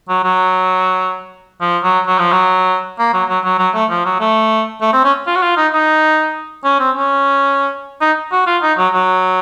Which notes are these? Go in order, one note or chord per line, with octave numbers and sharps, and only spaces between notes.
F#3
F#3
F3
F#3
F#3
F3
F#3
A#3
F#3
F#3
F#3
F#3
A3
F3
F#3
A3
A3
C4
C#4
F4
F#4
F4
D#4
D#4
C#4
C4
C#4
D#4
F#4
F4
D#4
F#3
F#3